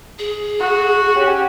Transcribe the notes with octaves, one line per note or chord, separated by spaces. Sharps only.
G#4
F#4
C#4 G4